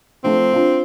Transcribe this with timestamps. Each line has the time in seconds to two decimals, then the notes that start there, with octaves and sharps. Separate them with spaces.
0.24 F3 A3 C4
0.53 D4 F4